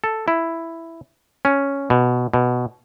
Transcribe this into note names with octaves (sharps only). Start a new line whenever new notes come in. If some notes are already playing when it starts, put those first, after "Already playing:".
A4
E4
C#4
B2
B2